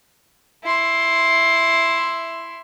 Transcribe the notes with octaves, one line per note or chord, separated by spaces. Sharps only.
E4 C6